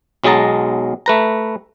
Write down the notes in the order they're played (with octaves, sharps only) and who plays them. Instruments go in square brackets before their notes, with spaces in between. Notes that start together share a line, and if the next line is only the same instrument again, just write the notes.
[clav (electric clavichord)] B1 F#3 G#3 D#5 A5 A#5
A3 B4 A#5